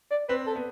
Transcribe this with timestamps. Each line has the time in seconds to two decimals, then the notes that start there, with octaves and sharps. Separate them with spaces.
0.11 D5
0.29 C4 B4
0.47 A4
0.56 B3